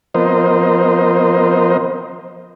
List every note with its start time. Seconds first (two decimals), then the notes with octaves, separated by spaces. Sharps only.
0.14 F3 B3 C4 A#4 C5 D#5